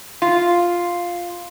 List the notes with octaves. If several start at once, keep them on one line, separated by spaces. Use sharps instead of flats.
F4